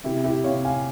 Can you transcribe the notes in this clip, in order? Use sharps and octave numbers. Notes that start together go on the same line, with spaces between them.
C3 E4 G4
E4 G4
C3 C#5 F5
F5 G#5